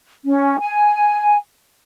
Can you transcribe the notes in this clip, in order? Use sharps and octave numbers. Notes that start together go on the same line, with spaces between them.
C#4
G#5